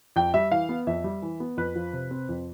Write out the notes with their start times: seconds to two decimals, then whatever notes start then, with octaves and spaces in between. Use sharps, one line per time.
0.16 F2 G5
0.34 G3 E5
0.52 E3 F5
0.69 B3
0.87 F2 E5
1.04 G3
1.22 E3
1.40 B3
1.57 F2 B4
1.75 F3
1.93 C3
2.11 C4
2.29 F2